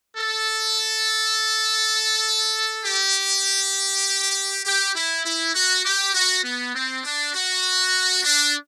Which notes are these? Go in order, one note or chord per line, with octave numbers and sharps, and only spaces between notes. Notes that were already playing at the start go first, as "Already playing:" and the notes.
A4
G4
G4
E4
E4
F#4
G4
F#4
B3
C4
D4
F#4
D4